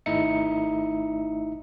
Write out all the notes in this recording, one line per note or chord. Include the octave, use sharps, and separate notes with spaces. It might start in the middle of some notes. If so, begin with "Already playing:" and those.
G#1 A3 D#4 E4 E5 C#7